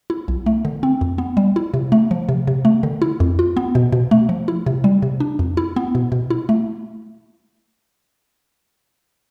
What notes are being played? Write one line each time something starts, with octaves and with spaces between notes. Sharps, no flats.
E4
B1
A3
D3
C4
F2
B3
G3
E4
C3
A3
F3
C3
C3
A3
D3
E4
F2
F4
B3
B2
B2
A3
F3
E4
C3
G3
C3
D4
F2
E4
B3
B2
B2
E4
A3